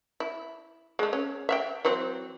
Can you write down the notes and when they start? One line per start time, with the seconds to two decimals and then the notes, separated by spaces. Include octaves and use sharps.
0.20 E4
0.99 G#3 A3
1.13 C#4
1.49 E5 F5 G5
1.85 E3 F#3 C4